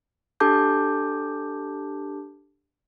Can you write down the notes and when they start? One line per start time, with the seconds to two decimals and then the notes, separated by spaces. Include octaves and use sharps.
0.40 D4 G4 A4 A5 D6 G6